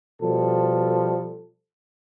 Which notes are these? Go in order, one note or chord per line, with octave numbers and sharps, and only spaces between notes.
B2 F3 G3 A4